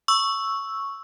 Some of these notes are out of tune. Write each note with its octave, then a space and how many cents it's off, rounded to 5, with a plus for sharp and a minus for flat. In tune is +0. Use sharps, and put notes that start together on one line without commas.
C#6 +0 E6 +0